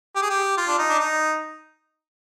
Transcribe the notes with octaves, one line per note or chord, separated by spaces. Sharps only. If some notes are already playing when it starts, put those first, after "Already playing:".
G4
G#4
G4
F4
D4
D#4
D4
D#4